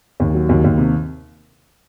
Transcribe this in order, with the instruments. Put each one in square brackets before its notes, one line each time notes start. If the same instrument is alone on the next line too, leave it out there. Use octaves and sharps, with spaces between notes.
[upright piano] D#2
F#3
D#2
D#2
C3